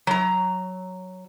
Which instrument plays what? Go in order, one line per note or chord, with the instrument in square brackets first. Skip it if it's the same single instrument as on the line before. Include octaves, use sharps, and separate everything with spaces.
[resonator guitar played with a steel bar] F#3 A#5